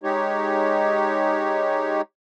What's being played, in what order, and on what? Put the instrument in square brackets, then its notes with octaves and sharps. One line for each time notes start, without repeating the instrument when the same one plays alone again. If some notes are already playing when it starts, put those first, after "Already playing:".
[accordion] G#3 D#4 G4 C#5